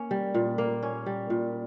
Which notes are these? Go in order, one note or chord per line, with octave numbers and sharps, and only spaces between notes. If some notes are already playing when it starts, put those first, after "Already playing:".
Already playing: A#3 C#4
G3
A#2
A#3
C#4
G3
A#2